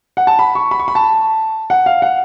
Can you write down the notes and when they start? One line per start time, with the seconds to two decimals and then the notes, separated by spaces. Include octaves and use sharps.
0.17 F#5
0.27 A5
0.39 B5
0.55 C#6
0.71 B5
0.79 C#6
0.88 B5
0.95 A5
1.70 F#5
1.86 F5
2.02 F#5